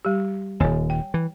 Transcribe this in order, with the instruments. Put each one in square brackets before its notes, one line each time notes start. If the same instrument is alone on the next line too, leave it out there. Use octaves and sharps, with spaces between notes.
[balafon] G3 G4
[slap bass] D#1 D#2 [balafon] C#5 G#5
[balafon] G5
[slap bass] E3